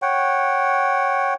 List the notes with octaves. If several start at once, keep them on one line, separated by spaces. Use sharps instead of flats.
C#5 F#5 G5